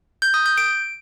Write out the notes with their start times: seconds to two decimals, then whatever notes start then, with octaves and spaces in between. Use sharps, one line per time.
0.22 G6
0.34 D#6
0.46 G6
0.58 D7